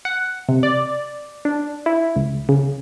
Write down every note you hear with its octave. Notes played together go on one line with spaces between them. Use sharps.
F#5
C3
D5
D4
E4
C#2
C#3